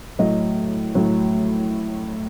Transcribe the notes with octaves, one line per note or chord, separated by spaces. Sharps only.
A2 F#3 D#5
A2 F#3